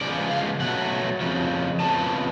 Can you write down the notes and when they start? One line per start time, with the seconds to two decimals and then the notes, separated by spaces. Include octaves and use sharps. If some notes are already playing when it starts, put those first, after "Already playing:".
0.01 C#3 F3 G#3 B3 D5
0.31 F5
0.60 B2 F#3 A3 F#5
1.20 F2 C#3 F3
1.80 F2 C#3 F3 B3 A5